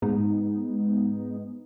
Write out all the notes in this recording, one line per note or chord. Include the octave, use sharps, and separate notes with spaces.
G#2 G#3 B3 D#4